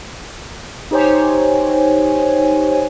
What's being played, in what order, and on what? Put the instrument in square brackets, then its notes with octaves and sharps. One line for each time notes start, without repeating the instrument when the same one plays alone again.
[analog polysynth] D#4 G4 C5 C#5 G#5